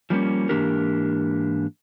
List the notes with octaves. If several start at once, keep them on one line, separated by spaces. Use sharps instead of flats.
F3 G3 A#3 C#4
G#2 E3 A#3 D4 G4 A#4